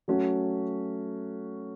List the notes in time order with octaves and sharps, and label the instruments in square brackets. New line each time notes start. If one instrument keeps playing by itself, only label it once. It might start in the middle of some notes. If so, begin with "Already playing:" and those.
[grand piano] F#3 A3 C#4 F#4